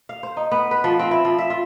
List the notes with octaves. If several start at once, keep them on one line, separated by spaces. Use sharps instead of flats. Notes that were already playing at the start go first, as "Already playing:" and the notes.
F5
C5
D#4
B3
B4
F3
C4
E4
F3
E5
F4